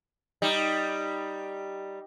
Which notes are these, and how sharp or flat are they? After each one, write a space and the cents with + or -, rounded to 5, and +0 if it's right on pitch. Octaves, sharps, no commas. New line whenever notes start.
G3 +0 D#4 +0